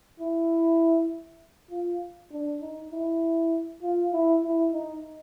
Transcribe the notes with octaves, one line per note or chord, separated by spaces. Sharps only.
E4
F4
D4
D#4
E4
F4
E4
E4
D#4